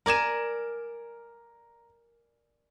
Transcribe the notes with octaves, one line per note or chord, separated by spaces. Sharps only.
A#4 D5 G#5 A#5 E7